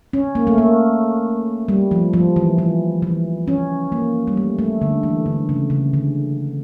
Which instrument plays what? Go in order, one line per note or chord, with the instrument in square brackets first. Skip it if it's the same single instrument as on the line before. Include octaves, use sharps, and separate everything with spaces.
[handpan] C#4
A#3
A3
A#3
G3
F3
F3
E3
E3
E3
C#4
A#3
G3
A3
A3
D3
E3
D3
C#3
C#3
D3